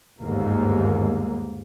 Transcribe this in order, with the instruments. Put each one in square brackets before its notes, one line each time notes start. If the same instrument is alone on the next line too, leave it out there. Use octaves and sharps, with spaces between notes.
[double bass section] G1 D#2 G#2 A#3